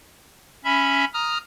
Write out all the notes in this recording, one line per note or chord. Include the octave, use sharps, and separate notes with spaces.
C#4 E5 B5
A#5 D#6 F6